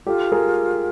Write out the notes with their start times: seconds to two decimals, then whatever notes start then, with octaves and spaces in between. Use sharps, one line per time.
0.06 F4 G4 A4
0.32 G#4 A#4